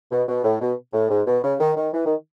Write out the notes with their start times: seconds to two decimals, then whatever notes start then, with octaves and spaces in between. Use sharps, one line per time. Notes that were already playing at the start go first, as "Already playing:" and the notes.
0.11 B2
0.28 B2
0.44 A2
0.61 B2
0.93 A2
1.10 G#2
1.27 B2
1.43 C#3
1.60 D#3
1.77 D#3
1.92 E3
2.05 D#3